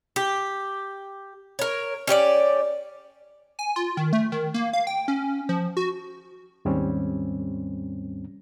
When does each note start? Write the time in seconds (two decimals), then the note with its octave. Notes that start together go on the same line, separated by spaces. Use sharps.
0.16 G4
1.59 A#4 C#5
2.07 C#4 G4 C#5 D5
3.59 G#5
3.76 F4
3.97 D#3
4.13 A3
4.32 D#3
4.54 A#3
4.73 F5
4.87 G5
5.08 C#4
5.49 F3
5.77 F#4
6.65 D#2 G#2 G3 C4 C#4